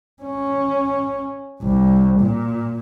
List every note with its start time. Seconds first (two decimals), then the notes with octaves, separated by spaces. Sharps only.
0.23 C#4
1.61 C2
2.20 A#2